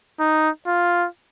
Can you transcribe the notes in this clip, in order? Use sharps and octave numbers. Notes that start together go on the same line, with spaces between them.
D#4
F4